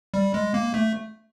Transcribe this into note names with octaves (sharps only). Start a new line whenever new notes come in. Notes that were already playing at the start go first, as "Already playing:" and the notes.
G3
G#3
A#3
A3